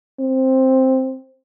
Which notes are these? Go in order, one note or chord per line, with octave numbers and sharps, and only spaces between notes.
C4